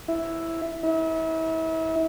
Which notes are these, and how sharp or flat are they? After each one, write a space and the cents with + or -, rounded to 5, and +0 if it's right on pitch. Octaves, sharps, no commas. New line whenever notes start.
E4 +0
E4 -35